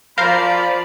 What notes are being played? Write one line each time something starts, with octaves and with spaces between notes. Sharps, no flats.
F3 A#4 C5 D5 F5 B5